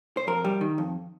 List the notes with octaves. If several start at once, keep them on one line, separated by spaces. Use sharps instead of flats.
C5
F2 A#4
G3
D#3
F2